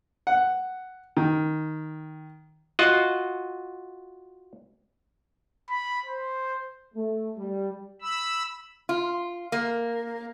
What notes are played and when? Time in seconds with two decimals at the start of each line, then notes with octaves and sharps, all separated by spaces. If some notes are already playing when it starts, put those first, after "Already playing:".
0.27 F#5
1.17 D#3
2.79 F4 F#4 D#5 F#5
5.70 B5
6.06 C5
6.95 A3
7.37 G3
8.02 B5 E6
8.89 F4
9.52 A#3